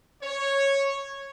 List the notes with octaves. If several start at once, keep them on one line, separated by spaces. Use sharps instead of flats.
C#5